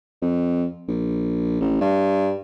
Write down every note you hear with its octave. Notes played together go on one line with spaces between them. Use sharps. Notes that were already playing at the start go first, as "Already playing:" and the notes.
F2
A#1
A1
G2